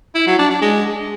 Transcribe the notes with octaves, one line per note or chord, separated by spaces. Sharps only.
E4
F#3
D4
D4
G#3